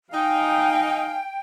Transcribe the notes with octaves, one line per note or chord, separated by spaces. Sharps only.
D#4 F5 G5 G#5